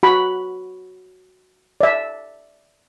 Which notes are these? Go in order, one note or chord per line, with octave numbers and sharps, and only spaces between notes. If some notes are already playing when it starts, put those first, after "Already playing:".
F#4 B5
D5 E5